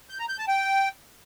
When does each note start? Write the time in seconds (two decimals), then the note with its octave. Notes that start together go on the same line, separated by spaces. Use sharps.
0.10 G6
0.19 A#5
0.29 G6
0.39 A5
0.48 G5